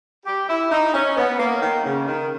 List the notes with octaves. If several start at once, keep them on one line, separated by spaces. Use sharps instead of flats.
G4
E4
D#4
C#4
B3
A#3
D#3
C#3
D#3